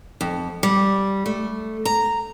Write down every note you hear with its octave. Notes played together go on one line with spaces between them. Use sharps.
F2
G3
A3
A#5